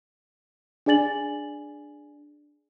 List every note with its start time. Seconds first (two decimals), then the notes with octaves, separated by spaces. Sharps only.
0.86 D4 G#4 D5 G#5 A6 F#7